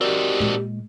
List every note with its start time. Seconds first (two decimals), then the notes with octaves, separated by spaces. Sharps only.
0.01 C4 D#4 F#4 G4 A#4 D5
0.40 A#2 G#3